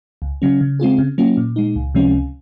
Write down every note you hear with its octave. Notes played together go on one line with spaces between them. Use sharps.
C#2
C#3 F#3 C#4
C#3
G#3 C4 F4 G#4
C#3
F#3 A#3 C#4 F4
A#2
G#3 D#4
C#2
C3 F3 G#3 C#4
C#2